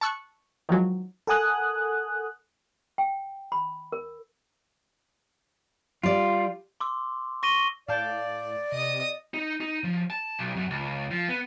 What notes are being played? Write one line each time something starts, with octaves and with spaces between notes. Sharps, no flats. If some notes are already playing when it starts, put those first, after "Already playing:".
A5 C#6 E6 F#6 C#7
D#3 F3 F#3 G#3
A4 A#4 F#5 G#5 D#6 F#6
G5
B5
A#4
G3 F4 D5
C6 D6 E6
C#6 A#6 D#7 G7
A2 D5 F5 A5 G6
C3 D#5 D#6
D#4
D#4
F3
A5
B1
F#2
C#2
F3
B3